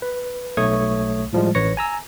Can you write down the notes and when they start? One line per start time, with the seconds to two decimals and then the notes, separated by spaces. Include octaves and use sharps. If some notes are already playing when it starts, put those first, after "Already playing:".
0.02 B4
0.57 B1 A3 C#5 C#6 D#6 G#6
1.33 A2 F3 G3 G#3
1.55 A1 B4 C#5 A#6 C#7
1.77 G#5 A#5 E6